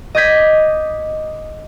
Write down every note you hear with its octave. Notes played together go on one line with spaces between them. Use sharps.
D#5 D6 G6 G#6 B6